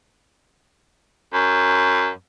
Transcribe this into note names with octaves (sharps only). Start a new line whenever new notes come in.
F#2